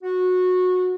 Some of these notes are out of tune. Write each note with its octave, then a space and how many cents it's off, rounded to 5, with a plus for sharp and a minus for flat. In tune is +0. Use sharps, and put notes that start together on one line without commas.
F#4 -20